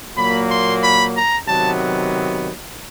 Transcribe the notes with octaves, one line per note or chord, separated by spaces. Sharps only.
A#2 F#3 A#3 B5
C6
B5
A#5
C3 D#3 F#3 B3 A5